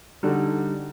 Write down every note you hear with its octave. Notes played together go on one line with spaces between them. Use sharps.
D3 G3 D#4 F#4 A4